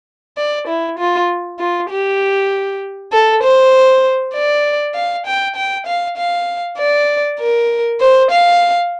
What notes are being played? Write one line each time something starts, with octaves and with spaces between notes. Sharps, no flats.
D5
E4
F4
F4
G4
A4
C5
D5
F5
G5
G5
F5
F5
D5
A#4
C5
F5